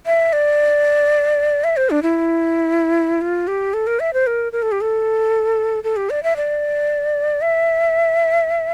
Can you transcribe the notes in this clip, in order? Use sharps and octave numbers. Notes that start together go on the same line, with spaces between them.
E5
D5
E5
C5
D4
E4
F4
G4
A4
A#4
E5
C5
A#4
A#4
A4
G4
A4
A4
G4
D5
E5
D5
E5